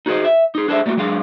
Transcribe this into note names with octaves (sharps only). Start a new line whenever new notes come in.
D#4 F#4 G#4 B4 C5 D#5
E5
D#4 G#4
D4 G#4 A4 C5 C#5 E5
G3 A3 A#3 D#4 F4 F#4
F#3 G#3 D4 G#4 F5